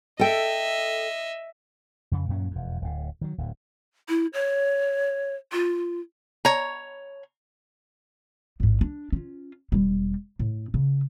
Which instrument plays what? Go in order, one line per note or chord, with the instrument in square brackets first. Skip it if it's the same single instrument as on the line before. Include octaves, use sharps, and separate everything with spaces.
[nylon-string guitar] A4 G5 [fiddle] D#5 E5
[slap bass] F2 C#3
F#2 A#2 F#3 C#4
E1 F2
D1 A2
D#3 F#3
D1 D2
[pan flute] E4
C#5
F4
[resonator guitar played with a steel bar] C#5 A#5
[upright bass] A1 G#2
D4
C#4 F4
E1 G3
A2
C#3